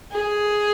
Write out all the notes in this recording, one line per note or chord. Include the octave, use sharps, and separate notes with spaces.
G#4